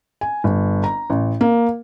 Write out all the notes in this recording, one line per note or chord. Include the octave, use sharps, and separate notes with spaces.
G#5
G1
A#5
A1
A#3